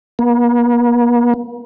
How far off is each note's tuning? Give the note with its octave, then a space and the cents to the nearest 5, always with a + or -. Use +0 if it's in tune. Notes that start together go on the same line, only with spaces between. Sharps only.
A#3 +45